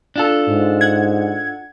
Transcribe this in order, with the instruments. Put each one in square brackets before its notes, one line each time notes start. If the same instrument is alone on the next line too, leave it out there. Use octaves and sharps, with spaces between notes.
[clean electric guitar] D4 F4 A4
[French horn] G#2
[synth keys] F#5 G#6